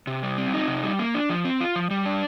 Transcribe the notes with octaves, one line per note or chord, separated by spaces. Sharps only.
C3
G3
C4
D#4
C3
G3
A#3
D4
F3
C4
F4
F3
G3
D4